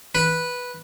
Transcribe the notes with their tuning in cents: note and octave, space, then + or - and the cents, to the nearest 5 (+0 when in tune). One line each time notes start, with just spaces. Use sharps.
B4 -5